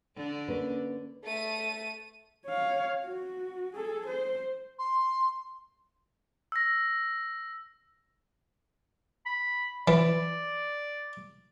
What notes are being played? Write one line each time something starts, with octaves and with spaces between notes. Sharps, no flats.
D3 D4
A#3 C#4 B4
A3 D#7
C#5 F5
F#4
G#4 A4
C5
C6
E6 A#6
B5
E3 D5